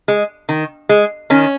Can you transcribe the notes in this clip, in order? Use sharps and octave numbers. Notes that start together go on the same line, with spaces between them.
G#3
D#3
G#3
D#3 C#4